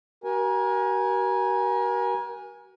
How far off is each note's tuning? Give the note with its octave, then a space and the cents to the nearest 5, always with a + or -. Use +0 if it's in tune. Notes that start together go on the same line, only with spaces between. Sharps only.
F#4 +45 A#4 +35 G#5 -5